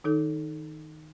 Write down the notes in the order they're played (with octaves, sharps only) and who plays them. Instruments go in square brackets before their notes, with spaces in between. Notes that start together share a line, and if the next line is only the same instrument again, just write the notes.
[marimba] D#3 D#4 A4